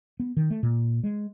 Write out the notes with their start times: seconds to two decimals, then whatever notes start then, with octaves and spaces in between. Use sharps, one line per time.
0.20 B3
0.37 D#3
0.51 A3
0.63 A#2
1.04 G#3